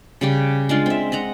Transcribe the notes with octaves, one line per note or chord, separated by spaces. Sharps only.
C#3 G3 G4
G#3 D4 F4
C4 E5
D#5 F#5 A#5